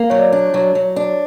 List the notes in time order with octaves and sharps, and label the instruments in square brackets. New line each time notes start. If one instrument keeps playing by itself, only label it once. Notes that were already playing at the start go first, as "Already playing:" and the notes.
Already playing: [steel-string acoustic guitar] A#3
[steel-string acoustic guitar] F#3 [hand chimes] C#5
[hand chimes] D5
[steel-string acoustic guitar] D4
[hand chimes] C#5
[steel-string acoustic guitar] F#3
F#3
D4